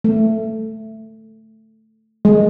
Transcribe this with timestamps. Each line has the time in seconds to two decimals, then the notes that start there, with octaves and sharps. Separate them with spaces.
0.04 A3
2.25 G#3